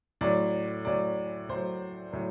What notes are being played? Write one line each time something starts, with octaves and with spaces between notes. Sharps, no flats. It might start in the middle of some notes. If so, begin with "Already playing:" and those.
A2 F#3 D5
A2 F#3 D5
A2 F#3 C5
A2 F#3